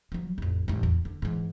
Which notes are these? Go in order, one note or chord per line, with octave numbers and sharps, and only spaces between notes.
F3 F#3
A1 F2
A1 G#2
E2
D3
G#2 E3